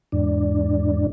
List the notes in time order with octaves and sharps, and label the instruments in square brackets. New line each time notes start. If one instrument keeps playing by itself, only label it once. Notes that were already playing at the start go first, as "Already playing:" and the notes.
[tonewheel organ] E2 G#2 D4